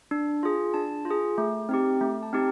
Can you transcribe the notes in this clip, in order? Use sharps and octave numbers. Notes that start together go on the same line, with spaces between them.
D4
F4 G#4
D4 A5
F4
G#4
A3
C4 D#4 G4
A3
A5
C4 D#4 G4